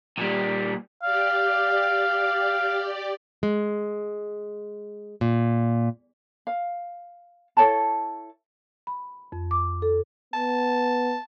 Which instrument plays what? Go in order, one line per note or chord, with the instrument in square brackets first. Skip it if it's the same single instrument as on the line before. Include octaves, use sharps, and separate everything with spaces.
[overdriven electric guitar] A#2 G3
[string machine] G4 D5 [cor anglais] F5
[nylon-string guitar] G#3
A#2
[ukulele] F5
E4 A4 C#5 A5
[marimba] B5
F2
D6
A4
[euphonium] B3 [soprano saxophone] A5